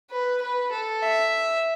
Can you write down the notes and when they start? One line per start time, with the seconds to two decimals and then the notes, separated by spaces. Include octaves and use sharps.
0.11 B4
0.42 B4
0.72 A4
1.03 E5